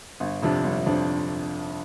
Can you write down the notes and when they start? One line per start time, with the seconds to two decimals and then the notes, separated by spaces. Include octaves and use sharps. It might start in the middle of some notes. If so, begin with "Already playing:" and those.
0.20 G1
0.42 F2 C3 F3 D4
0.64 G1
0.86 F2 C3 F3 D4